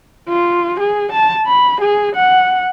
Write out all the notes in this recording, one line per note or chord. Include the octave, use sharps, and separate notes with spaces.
F4
G#4
A5
B5
G#4
F#5